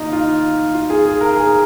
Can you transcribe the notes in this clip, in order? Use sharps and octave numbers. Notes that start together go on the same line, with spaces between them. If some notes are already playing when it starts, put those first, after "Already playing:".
Already playing: D#3 A#3 D#4 F4
F4
F4
G#4
G#4
A#4
G#4